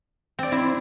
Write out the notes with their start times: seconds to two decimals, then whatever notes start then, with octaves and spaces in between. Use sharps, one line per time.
0.39 C4 D5
0.52 C4 E4 C6